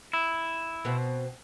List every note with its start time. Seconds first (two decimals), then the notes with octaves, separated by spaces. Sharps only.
0.13 E4
0.85 B2 B3 C4